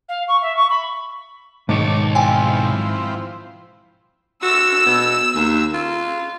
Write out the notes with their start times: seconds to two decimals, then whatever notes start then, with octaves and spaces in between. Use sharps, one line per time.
0.09 F5
0.28 C#6
0.42 E5
0.56 C#6
0.70 B5
1.69 B1 G#2 D#3 C#5 A5 D6
2.15 F3 C4 E4 G5 G#5
4.42 F#4 E6
4.86 B2
5.34 D#2
5.74 F4